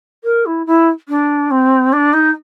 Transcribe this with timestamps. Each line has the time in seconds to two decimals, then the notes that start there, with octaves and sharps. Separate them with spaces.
0.24 A#4
0.46 E4
0.66 E4
1.08 D4
1.51 C4
1.93 D4
2.13 D#4